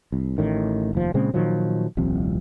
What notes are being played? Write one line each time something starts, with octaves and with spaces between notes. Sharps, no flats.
C2
A1 A2 D#3
F1 D#2 F3
A#2 C#3 G#3 C4
A#2 D#3 F3 F#3
D#1 C2 C3 F3